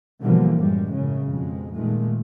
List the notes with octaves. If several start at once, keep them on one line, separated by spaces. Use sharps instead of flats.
B2 D3 E3 F3 G3 A#3
F#2 A2 G3 G#3
F#2 A2 C#3
F2 B2 G#3
A#2 D#3 G#3 A3